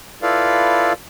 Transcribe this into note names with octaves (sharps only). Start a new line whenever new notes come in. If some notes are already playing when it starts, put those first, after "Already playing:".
E4 F4 A4 B4 D5 F5